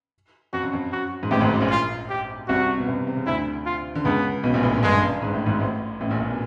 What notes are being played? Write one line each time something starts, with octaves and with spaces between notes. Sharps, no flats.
F2 F#4
F#2
F2
F#2 F#4
G#2
A1 A2 G4
G#1 G#2
F#2
A#1 A#2
F4
G4
C2 C3 F#4
B2
C2 C3
C3
C#3
D2 D3 E4
F4
D3
C#2 C#3 B3
B1 B2
A#1 A#2
A1 A2
G1 G2 G#3
G1 G2
G#2
A2
G#1 G#2
A1 A2
A1 A2
A#1 A#2
A#1 A#2
B2